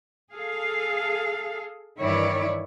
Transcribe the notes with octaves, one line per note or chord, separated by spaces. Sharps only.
G#4 A4 F5
G2 D#3 E3 E4 C#5 D5